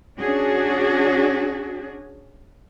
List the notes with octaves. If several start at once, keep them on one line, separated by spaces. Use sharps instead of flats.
C#4 D4 F#4 G#4